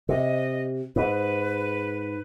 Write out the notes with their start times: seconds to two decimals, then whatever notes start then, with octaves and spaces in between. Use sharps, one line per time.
0.09 C3 D#5
0.96 G#2 B4